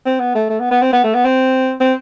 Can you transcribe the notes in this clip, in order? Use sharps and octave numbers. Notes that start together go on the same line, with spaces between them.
C4
B3
A3
A3
B3
B3
C4
B3
A3
B3
C4
C4